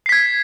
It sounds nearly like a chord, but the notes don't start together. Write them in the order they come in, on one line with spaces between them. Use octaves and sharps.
C7 B6 G#6